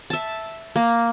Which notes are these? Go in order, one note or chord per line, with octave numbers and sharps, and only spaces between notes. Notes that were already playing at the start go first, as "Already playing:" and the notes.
E5 A5
A#3